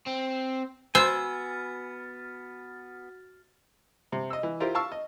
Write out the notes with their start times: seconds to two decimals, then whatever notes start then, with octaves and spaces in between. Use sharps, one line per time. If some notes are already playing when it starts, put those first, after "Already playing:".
0.07 C4
0.95 B3 F#4 C5 G#5 E6 F6 A6
4.12 C3
4.30 D#5 E6
4.43 E3
4.60 E4 F4 G4 A#4 C5
4.75 F5 A5 C#6 E6
4.92 D#5